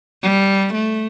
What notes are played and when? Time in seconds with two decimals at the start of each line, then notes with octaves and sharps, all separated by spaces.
0.23 G3
0.74 A3